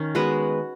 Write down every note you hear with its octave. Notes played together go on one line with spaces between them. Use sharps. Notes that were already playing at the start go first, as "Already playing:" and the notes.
Already playing: D#3 C#4
G#3 B3 F#4 B4